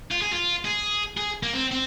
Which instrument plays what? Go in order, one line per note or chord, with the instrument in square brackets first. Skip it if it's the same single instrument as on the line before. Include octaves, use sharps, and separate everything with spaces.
[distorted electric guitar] F4
G#4
F4
G#4
G#4
A#3
C4
C4